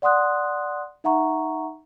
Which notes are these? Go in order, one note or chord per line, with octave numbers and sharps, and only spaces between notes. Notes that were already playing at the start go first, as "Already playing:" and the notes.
D5 F#5 C6 D#6 F#6
D#4 E5 F#5 A#5 C#6